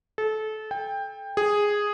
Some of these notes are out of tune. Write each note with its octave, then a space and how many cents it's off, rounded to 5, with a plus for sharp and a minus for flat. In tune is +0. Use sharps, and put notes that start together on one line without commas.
A4 -25
G5 +20
G#4 -5